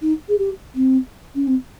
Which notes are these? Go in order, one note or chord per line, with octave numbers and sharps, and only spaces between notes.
D#4
G#4
G4
C4
C#4
C4